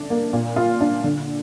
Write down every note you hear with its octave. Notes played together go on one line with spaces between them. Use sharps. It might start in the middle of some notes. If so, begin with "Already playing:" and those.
Already playing: D3 D4
A#3
A#2
F4
D4
D3